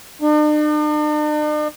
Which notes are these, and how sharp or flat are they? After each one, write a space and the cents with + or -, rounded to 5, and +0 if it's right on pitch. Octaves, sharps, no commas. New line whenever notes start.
D4 +45